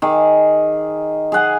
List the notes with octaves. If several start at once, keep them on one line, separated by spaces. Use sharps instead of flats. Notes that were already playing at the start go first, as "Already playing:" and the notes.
D#3 G#4 D6
G#4 F5 F#5 G#5